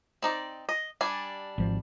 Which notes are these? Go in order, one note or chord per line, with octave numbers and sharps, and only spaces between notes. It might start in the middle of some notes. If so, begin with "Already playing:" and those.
C4 D#4 D5
D#5
G3 D4 G#5
G#1 F3